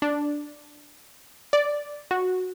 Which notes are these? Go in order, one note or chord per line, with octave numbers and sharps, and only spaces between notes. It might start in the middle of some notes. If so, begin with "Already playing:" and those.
D4
D5
F#4